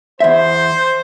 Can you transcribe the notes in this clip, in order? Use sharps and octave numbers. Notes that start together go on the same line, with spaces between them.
E2 C5 E5